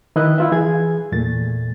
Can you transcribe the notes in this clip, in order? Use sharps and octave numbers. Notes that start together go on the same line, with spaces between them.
D#3 E4 B4 D#5 E5 F#6
E4 F4 E5
E3 G#4 G#6
E2 A#2 A3 A6